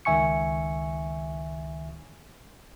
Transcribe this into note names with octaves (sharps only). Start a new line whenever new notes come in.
C#2 D#3 E5 G#5 C#6 C#7